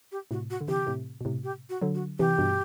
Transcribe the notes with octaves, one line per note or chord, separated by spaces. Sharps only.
G4
A2 C3 F#4
F#4
D3
C3 E3 G4
A2 C3
B2
A2 C3
G4
F#4
D3 F#3
F#4
C3 E3 G4
G2 B2